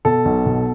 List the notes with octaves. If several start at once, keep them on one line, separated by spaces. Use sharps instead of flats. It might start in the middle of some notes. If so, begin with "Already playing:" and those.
B2 A4
B1
B2